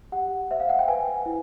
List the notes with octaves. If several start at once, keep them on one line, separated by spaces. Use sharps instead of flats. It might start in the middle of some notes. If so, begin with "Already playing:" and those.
G4 F#5
C5 E5
F5
F#5
G5
B4 G#5
E4